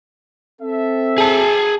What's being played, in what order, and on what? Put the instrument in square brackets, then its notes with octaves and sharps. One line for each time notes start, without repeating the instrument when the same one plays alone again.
[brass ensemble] C4 A4 E5
[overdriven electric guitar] G#4 A5